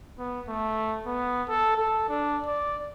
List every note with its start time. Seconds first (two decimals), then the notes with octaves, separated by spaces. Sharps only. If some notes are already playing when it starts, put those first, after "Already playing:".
0.18 B3
0.49 A3
1.06 B3
1.48 A4
1.77 A4
2.09 D4
2.46 D5